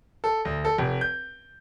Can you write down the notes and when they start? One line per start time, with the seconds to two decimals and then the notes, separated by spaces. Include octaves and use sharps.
0.24 A4
0.45 D2
0.65 A4
0.78 F1
1.01 G6